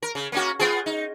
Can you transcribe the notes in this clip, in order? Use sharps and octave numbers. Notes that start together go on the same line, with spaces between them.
A#4
C#3
A#3 C#4 F#4
B3 F4 G#4
D#4